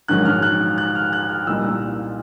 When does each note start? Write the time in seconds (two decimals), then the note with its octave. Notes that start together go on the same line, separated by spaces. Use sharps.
0.08 A#1 G#2 D#3 F#3 F#6
0.25 F6
0.42 F#6
0.78 F#6
0.95 F6
1.13 F#6
1.29 F6
1.46 C2 A#2 G3 A#3 D#4 E6